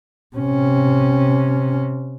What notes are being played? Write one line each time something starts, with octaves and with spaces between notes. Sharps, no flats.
C3 C#4